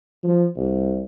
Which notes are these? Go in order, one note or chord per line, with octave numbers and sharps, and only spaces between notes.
F3
C2